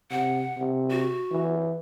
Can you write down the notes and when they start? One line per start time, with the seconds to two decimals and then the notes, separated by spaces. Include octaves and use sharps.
0.11 C3 F#5
0.57 C3
0.90 F#4
1.31 E3